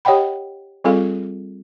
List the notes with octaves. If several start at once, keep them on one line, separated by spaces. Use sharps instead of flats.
G4 C#5 D#5 F#5 G5 B5
G3 C4 F4 G#4 A4 F5